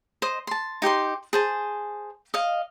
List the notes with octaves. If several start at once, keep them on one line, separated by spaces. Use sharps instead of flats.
C5 D#5
A5 C6
D#4 G4 C5 C6
G#4 C5 A5
D#5 F5